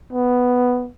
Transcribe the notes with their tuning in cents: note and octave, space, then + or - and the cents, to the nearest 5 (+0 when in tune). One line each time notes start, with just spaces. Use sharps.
B3 +0